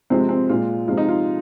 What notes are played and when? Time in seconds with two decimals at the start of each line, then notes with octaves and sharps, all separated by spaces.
0.10 C3 F3 G#3 C4
0.29 C4
0.49 A#2 G#3 F4
0.88 C3 F3 G#3 F4
0.97 D#4
1.09 F4